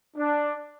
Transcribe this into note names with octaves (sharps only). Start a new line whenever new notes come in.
D4